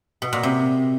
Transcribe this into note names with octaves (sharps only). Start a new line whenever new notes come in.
B2
A#2
C3